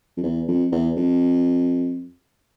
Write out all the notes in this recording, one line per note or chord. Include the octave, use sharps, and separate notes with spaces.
F2
E2
F2
E2
F2